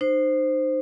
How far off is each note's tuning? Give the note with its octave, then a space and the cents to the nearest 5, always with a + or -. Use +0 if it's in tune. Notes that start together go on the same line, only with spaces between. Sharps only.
D#4 -35 C5 +0